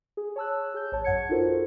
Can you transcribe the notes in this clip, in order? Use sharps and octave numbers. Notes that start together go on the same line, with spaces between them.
G#4
C#5 A5 E6 F#6
G#4 G6
A1 C#5 A5
F#2 F#5 G#6 C#7
D#4 F4 F#4 A4 A#4 C5